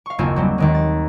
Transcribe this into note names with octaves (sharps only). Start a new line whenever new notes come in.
F5 C#6
F#1 D#2 A#3 C4 F4 G#5
F#3 G3 C4
D#2 D#3 G#3
A6